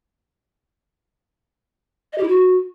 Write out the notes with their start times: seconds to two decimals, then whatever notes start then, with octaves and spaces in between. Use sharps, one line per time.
2.13 D#5
2.18 G4
2.23 E4
2.28 F#4